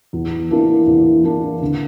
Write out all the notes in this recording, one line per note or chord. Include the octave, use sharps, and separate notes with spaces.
E2
E3 A#3 D4
E2
E3 A#3 D4
D3